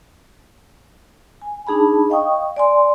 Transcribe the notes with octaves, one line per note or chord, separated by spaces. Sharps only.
G#5
D4 D#4 G#4 A5 B5
D#5 F5 G5 C#6 D#6
D5 G#5 C6